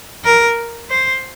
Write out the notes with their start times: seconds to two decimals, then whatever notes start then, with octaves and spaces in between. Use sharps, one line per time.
0.25 A#4
0.90 C5